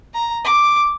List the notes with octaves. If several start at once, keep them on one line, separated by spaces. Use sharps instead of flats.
A#5
D6